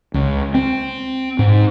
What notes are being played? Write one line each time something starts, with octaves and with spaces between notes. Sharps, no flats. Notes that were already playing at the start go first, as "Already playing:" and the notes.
C#2
C4
G#2